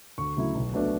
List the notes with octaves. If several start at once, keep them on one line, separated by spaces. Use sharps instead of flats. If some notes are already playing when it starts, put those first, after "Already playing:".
D2 C#6
C#3 F#3 A3 E4
B1
B2 A3 D4